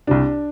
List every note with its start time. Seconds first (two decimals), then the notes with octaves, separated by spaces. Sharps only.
0.07 C2 C3 D4